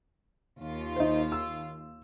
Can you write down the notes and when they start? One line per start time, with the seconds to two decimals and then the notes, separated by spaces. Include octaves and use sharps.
0.59 D#2 F4
0.96 D#4 C5
1.32 E6